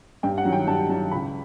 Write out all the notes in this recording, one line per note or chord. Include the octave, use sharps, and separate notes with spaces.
G2 G5
F#5
D#3 F#3
G5
G2 A5
D#3 F#3 A5
C#2 B5